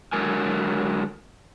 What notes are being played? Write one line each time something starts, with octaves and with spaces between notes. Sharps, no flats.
D3 F#3 G#3 A#4 G#5